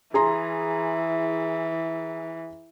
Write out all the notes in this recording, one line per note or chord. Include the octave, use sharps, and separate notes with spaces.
E3 G#4 A#5 C6